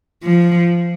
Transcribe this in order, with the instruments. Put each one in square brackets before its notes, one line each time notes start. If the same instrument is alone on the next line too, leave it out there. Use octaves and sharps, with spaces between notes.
[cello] F3